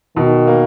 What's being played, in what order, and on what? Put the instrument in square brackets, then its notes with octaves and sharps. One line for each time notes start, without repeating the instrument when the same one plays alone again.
[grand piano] B2 [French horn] D#3
[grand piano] A#3